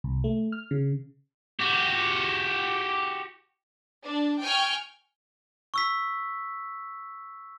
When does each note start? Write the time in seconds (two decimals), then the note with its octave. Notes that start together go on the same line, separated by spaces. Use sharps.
0.04 C2
0.24 A3
0.52 F6
0.71 C#3
1.60 F#4 G4
4.03 D4
4.41 G5 G#5 C#6 F6
5.74 C#6 E6 B6